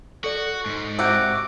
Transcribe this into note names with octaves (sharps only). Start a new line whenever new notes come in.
F#4 A4 D5
G#2
C3 F#4 D6 E6 G6